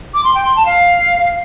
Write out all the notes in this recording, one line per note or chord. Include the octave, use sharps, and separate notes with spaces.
D6
C6
G5
C6
A5
F5